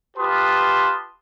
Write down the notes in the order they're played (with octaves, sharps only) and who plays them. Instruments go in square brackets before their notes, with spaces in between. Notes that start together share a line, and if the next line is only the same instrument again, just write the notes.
[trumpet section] F4 G4 B4 A5 C6 D#6